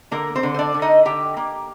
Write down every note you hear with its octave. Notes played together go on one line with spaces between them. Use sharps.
D3 A#3 A#4
C4 C5
D3
C5
D4 D5
D3
D#4 D#5
D3 G4 G5
A#3